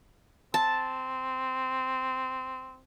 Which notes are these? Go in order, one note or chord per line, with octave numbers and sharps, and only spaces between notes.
C4 A5